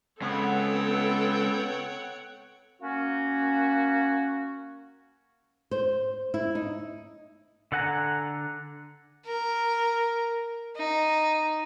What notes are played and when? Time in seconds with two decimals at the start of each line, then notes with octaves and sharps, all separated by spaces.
0.22 C#3 G#3 B3 C4 A4 C#5 F#5 G5
2.82 A#3 C#4 F#4
5.71 C5
6.34 E4
6.55 D#4
7.72 D3 A4 F#5 G#5 A#5
9.26 A#4
10.77 D#4